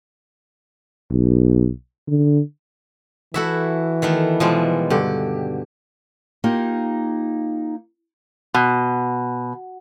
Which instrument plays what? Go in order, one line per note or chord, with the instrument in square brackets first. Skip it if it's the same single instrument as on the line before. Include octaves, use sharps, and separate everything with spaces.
[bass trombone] B1
D3
[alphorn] E3 [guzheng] E4 F#4 B5 [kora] A4 E5
[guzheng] D#3 A3 B3
[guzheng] B2 G3 G#3 [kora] F3
[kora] G2 D3 [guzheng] G4
[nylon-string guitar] A#3 D#4 F4 G4
[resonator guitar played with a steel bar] B2